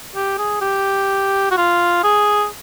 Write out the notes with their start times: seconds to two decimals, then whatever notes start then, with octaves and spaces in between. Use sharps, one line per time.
0.15 G4
0.38 G#4
0.61 G4
1.51 F#4
1.57 F4
2.04 G#4